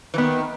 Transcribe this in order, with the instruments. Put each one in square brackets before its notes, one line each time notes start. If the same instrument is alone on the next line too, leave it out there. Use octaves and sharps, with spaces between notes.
[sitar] E3
[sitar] D#3 [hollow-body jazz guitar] B3